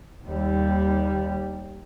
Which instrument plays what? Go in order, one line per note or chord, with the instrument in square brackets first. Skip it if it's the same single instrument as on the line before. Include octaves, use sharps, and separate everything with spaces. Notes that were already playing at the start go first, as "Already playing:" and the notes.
[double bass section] D#2 G3